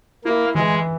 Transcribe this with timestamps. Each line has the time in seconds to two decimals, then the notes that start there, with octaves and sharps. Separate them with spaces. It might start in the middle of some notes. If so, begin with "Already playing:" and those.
0.25 A#3 E4
0.55 E3 G#3